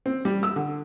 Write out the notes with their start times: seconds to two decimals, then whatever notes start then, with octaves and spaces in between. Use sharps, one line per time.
0.06 C4
0.25 G3
0.43 E6
0.56 D3